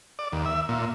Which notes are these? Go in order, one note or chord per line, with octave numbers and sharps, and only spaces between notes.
D5
D#2
E5
A#2